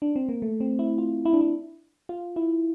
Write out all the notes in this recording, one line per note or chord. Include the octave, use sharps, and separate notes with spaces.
D4
C4
A#3
A3
C4
E4
F4
E4
D4
E4
F4
E4